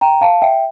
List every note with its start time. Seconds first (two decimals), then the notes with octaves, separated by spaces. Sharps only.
0.01 G5 A#5
0.21 F5 A5
0.42 E5 G5